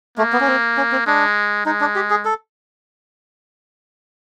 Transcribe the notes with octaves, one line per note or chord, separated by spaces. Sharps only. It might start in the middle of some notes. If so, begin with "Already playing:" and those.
A3 A#3
B3
C#4
C4
C#4
C4
G#3 D4
G#3 D#4
D4
G4
G#4
A4